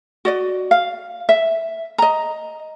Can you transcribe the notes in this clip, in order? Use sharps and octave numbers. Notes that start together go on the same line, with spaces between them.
F#4 D5 D#5
F5
E5
D#5 A#5